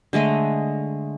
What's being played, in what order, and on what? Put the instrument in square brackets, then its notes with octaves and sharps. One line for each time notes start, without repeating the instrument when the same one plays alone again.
[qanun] D3 G#3 A3 D#5